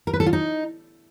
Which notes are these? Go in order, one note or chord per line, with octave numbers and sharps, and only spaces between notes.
A#4
B4
A4
F4
D#4